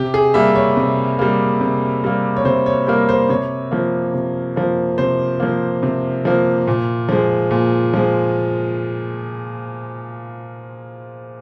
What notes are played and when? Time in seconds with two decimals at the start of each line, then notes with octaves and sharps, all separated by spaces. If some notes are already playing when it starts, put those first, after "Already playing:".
Already playing: C3 G4
0.14 G#4
0.34 G3 A#3 E5
0.56 C#5
0.77 C3
1.19 G3 A#3
1.61 C3
2.04 G3 A#3
2.37 C#5
2.45 C3 C5
2.66 C#5
2.87 G3 A#3 A#4
3.09 C5
3.29 C3 C#5
3.71 F3 A#3
4.14 C3
4.56 F3 A#3
4.98 C3 C5
5.40 F3 A#3
5.83 C3
6.25 F3 A#3
6.67 A#2
7.09 F3 G#3
7.51 A#2
7.94 F3 G#3